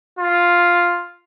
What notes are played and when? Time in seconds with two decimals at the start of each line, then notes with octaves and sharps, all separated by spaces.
0.19 F4